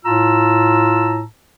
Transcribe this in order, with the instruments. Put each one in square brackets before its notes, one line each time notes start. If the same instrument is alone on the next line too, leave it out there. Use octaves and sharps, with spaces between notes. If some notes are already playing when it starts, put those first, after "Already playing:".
[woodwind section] A2 F4 A5 A#5 E6